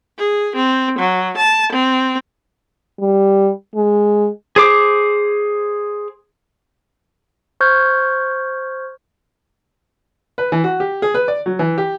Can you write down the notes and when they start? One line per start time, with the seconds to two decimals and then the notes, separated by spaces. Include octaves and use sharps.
0.18 G#4
0.56 C4
0.98 F#3
1.37 A5
1.72 C4
3.00 G3
3.75 G#3
4.56 G#4 C5 D6
7.60 C5 C#6 F6 G6 G#6
10.38 B4
10.52 E3
10.64 F#4
10.80 G4
11.02 G#4
11.14 B4
11.28 D5
11.46 F#3
11.59 E3
11.78 G4